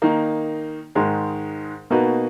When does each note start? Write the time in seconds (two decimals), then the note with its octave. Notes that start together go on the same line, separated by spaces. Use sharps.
0.02 D#3 A#3 D#4
0.95 G#2 D#3 G#3 D#4 A#4
1.90 B2 A#3 D#4 F#4 B4